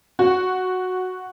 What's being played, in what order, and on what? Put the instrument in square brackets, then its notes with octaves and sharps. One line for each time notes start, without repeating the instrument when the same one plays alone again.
[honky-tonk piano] F#4